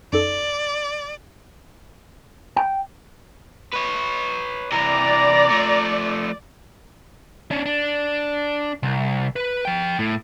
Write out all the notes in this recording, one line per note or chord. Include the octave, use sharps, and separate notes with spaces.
F#2 D#4 A4 D5
G5
B4 C#5
C3 E3 D5 A#5
F3 A3
C#4 D4
D4
C2
B4
F3 G5
A2